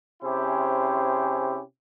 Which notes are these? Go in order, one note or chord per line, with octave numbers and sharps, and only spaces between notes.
C3 C#4 E4 G4 G#4 C5